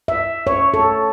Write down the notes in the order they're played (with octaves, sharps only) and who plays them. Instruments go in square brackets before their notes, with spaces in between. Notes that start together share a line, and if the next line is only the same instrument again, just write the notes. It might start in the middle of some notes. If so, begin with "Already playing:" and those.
[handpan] E5
C#5
A4